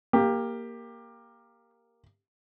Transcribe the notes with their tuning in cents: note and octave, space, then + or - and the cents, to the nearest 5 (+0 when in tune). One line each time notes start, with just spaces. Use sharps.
A#3 +0 G4 +15